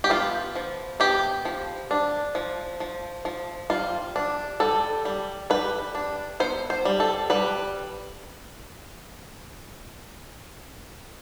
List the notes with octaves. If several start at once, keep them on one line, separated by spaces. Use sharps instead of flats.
G4
B3 F4
F3
B3 G4
F3
D4
F3
F3
F3
G3 F4
D4
G3 A4
G3
G3 B4
D4
B3 C5
C5
G3
A4
G3 B4